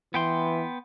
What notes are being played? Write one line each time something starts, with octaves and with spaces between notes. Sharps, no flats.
E3 B3 G5 C6